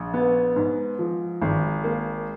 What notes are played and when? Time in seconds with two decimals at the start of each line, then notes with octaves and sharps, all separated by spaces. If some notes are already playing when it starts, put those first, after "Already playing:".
Already playing: A#1
0.14 B3
0.56 G#2
0.99 F3
1.42 G#1
1.84 A#3